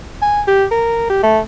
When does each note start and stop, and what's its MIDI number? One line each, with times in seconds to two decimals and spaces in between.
0.22 0.42 80
0.48 0.65 67
0.71 1.07 70
1.10 1.19 67
1.23 1.39 57